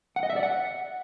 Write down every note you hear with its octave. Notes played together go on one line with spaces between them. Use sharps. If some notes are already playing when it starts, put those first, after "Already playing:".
F#5
D#5
E5
D5
F#5